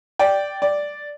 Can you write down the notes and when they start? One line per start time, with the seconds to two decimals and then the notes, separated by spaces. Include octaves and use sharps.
0.19 D5 G5
0.62 D5